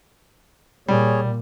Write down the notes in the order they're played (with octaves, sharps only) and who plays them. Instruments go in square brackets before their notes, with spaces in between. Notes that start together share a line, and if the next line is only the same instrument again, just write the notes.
[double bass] A#2 [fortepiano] G3 [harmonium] G#4 C#5